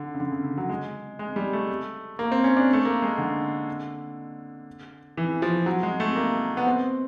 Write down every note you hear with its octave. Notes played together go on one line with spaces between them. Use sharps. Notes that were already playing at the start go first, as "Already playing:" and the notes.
Already playing: D3
C#3
D3
C#3
C#3
F#3
G#3
G#3
G3
A3
A#3
C4
C#4
D4
A3
A#3
G#3
D3
E3
F3
F#3
G#3
A3
A#3
B3
C4